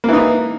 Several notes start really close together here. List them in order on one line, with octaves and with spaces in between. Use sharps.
A#3 E3 D#4